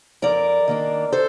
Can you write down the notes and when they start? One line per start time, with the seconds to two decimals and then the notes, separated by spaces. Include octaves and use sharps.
0.22 F2 A#4 D5
0.68 D#3 A#3 D4
1.12 A4 C5